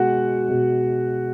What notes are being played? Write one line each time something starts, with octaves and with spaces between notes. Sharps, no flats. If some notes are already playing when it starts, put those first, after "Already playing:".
Already playing: B2 G#3 F#4 F#5
B2 G#3